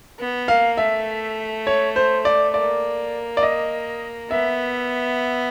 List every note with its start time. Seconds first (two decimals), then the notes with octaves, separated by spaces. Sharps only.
0.19 B3
0.48 A#3 F5
0.77 A3 E5
1.67 C#5
1.96 C5
2.25 D5
2.54 A#3 D5
3.37 D5
3.43 D#5
4.31 B3 E5